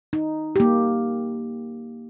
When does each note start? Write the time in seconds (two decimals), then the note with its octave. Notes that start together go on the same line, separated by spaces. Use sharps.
0.13 D#4
0.56 A#3 G4